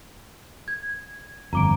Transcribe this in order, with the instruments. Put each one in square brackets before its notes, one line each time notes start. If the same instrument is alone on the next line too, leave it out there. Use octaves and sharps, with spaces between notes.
[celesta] G#6
[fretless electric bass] G1 F2 [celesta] A#5 D6 D7